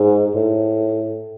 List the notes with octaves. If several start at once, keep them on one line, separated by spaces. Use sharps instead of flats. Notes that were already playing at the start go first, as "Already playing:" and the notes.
Already playing: G#2
A2